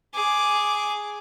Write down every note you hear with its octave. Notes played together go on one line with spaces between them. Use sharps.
G#4 D6